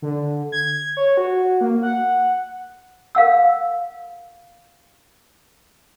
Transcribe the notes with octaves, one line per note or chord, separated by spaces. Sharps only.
D3
G#6
C#5
F#4
A#3
F#5
A#4 F5 F#5 E6